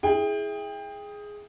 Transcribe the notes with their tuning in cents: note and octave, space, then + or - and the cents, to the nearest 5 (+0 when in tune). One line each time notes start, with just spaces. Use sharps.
E4 -15 G#4 +0 G5 +25